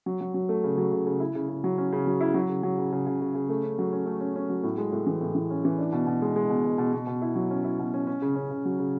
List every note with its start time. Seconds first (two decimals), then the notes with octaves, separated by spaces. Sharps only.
0.06 F#3
0.21 F#3
0.34 F#3
0.49 A3
0.64 C#3
0.78 F#3
0.92 C#3
1.07 C#3
1.20 E4
1.35 C#3
1.49 C#3
1.64 F#3
1.78 C#4
1.92 C#3
2.07 F#3
2.21 E4
2.34 F#3
2.49 C#3
2.63 F#3
2.78 C#3
2.92 C#3
3.06 C#3
3.21 C#3
3.35 C#3
3.49 A3
3.63 C#4
3.79 F#3
3.93 C#4
4.06 A3
4.21 C#4
4.36 C#4
4.50 F#3
4.63 A2
4.78 G#3
4.92 A2
5.06 E3
5.21 A2
5.35 E3
5.50 C#4
5.65 E3
5.79 D4
5.92 B2
6.07 B2
6.22 G#3
6.36 G#3
6.49 B2
6.64 B2
6.78 B2
6.93 B2
7.07 B2
7.22 E4
7.35 F#3
7.51 C#4
7.64 E4
7.79 B2
7.94 C#4
8.07 C#4
8.22 C#3
8.36 C#4
8.51 C#3
8.65 F#3
8.79 C#3